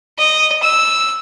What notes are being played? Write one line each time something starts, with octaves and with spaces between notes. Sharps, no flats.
D#5
E6